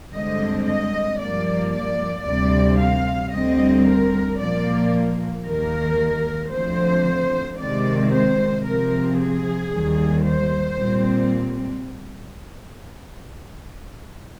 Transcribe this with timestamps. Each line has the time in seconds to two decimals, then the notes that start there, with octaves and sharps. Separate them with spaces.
0.12 G2 D3 G#3 C4 D#5
0.65 D#5
1.19 G2 F3 A#3 D5
1.73 D5
2.25 D2 C3 G3 C4 D5
2.78 F5
3.32 D2 D3 G3 C4 D#5
3.85 A#4
4.38 A#2 F3 A#3 D5
5.45 D#2 D#3 A#3 A#4
6.52 D2 D3 F3 C4 C5
7.58 C3 D#3 G#3 C4 D5
8.11 C5
8.64 C3 F3 C4 A#4
9.17 G#4
9.71 D#2 D#3 G3
10.24 C5
10.77 A#2 G3 C4